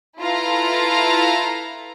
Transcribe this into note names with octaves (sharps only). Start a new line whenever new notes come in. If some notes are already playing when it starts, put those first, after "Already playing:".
E4 F4 A4 B4 F5 A#5